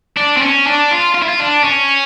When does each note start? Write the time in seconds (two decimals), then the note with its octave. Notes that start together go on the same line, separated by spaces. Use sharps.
0.17 D4
0.37 C4
0.42 C#4
0.67 D4
0.91 F4
1.15 F4
1.22 E4
1.29 F4
1.40 D4
1.64 C#4